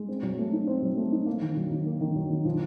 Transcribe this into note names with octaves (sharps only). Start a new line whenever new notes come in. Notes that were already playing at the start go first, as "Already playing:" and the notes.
Already playing: G#3
C4
F#3
A3
D#4
C4
F#3
A3
D#4
A#3
D#3
F#3
D#3
A#3
D#3
F#3
D#3
F3